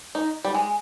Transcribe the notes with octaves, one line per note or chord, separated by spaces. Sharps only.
D#4
G3
G#3